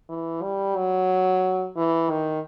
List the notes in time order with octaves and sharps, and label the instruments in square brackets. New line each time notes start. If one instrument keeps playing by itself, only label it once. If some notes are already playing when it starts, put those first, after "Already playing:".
[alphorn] E3
G3
F#3
E3
D#3